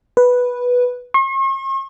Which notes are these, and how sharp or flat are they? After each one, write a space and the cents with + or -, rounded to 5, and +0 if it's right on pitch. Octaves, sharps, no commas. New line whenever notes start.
B4 -5
C#6 -45